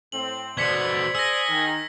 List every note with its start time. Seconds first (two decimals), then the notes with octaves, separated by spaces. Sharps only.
0.12 A2 C4 F#7
0.57 B2 D3 C5 D5 G#6 B6 C#7
1.15 G#4 E6 A#6
1.48 D#3